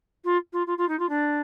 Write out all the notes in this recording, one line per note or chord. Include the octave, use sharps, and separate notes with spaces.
F4
F4
F4
F4
D#4
F4
D4